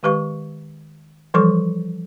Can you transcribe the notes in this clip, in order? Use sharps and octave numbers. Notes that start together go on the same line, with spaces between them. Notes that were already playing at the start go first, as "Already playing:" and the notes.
D#3 G#3 G4 B4 F5 C#6
E3 F3 G3 A4 C#6 D6